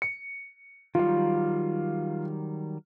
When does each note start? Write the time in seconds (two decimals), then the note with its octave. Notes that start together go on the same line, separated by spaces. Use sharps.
0.02 C#7
0.95 D#3 F#3 G3 F4 F5